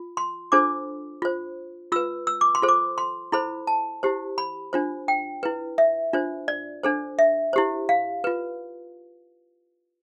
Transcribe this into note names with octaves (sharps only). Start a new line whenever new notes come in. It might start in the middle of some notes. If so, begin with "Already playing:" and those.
Already playing: F4
C6
D4 F4 A4 C5 D6
F4 C5
F4 B4 E6
E6
D6
C6
F4 A4 C5
D6
C6
E4 A4 C5 B5
A5
E4 G4 C5
B5
D4 F4 C5
G5
E4 B4
E5
D4 F4 C5
D5
D4 A4 C5
E5
E4 G4 C5
F5
F4 B4